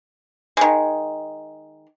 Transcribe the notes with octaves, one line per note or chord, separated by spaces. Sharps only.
D#3 G#3